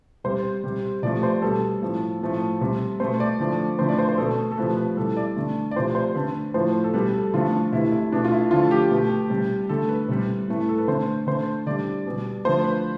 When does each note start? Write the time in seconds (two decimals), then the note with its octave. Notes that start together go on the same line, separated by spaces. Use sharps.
0.24 C3 G3 C5
0.64 C3 G3
1.03 C3 F3 A3 D5
1.23 C5
1.42 B2 G3 A4
1.82 A2 F3 A3
2.21 A2 F3 A3
2.61 C3 G3
3.00 B2 A3 C5
3.20 D5
3.40 D3 F3 A3
3.79 D3 F3 A3 C5
3.89 D5
3.98 C5
4.09 C5
4.18 B2 A3 A4
4.52 A4
4.58 C3 F3 A3 B4
4.77 B4
4.97 C3 E3 G3 A4
5.17 D5
5.36 D3 A3
5.71 D5
5.75 C3 F3 A3 C5
5.95 C5
6.15 D3 A3 B4
6.54 A2 F3 A3 C5
6.84 A4
6.94 B2 G3 B4
7.14 A4
7.34 D3 F3 A3 F4
7.52 D4
7.72 C3 E3 A3 E4
7.92 E4
8.12 B2 A3 D4
8.25 F4
8.31 E4
8.51 D3 F3 A3 F4
8.71 G4
8.91 B2 A3
9.30 C3 G3
9.69 D3 A3 A4
9.89 B4
10.08 C3 G3
10.48 A2 E3 A3
10.69 A4
10.78 B4
10.88 D3 A3 C5
11.27 D3 A3 C5
11.66 D3 G3 D5
12.06 B2 G3
12.45 D3 F3 A3 C5
12.64 B4